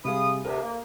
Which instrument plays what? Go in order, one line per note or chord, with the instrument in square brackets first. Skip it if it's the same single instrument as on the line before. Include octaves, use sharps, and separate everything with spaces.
[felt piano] C3 G3 G#4 [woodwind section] F5 B5 D#6
[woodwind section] D2 C3 [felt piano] A#4
[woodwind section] A#3